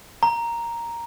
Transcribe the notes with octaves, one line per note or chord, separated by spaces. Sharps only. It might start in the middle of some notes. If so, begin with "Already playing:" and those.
A#5